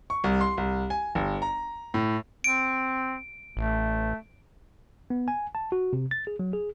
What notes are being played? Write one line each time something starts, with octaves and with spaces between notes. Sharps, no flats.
C#6
C2
C6
C2
G#5
G1
A#5
A2
C4 D7
A1 A3
B3
G#5
A5
F#4
C3
A6
G#4
F#3
G#4